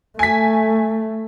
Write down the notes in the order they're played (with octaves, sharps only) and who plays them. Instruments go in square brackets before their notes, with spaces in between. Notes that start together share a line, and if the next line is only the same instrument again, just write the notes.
[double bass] A3 [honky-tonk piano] G#5 B6